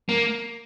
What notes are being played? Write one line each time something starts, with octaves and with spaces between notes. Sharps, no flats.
A#3